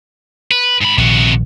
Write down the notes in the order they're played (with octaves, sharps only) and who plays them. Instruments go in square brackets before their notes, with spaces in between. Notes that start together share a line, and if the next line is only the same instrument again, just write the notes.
[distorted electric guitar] B4
G#2 B5
[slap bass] A#1 D#3 [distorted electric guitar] C3 F#4